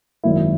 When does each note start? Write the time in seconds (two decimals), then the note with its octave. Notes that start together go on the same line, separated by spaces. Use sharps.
0.24 G#1 F#2 D#3 F#3 A#3 E4